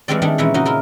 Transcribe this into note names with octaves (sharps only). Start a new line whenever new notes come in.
E3 F3 G3 G#3 C4 D5
D#3 G3 A3 D4 G#4
A#2 E3 G#3 C#4 E4
C#3 D#4 F#4 D#5
E4 F4 A#4